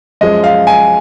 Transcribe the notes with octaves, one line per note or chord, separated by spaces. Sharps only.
F#2 F3 G#3 D#5
F5
G#5